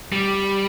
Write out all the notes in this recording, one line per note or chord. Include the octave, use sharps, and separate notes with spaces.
G3